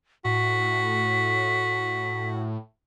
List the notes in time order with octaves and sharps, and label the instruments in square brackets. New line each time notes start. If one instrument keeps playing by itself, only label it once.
[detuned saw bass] A2 [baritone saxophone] F#4 [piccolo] B6